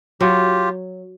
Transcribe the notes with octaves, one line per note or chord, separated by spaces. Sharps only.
F#3 F4 G4